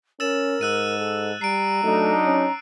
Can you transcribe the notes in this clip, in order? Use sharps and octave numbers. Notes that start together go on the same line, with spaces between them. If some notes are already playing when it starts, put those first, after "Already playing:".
C#4 A#4 E6 A6 E7
G#2 E6 F#6 D#7
A4
G3 A#5 C7 D7
F#3 A3 D4 D#4
C#4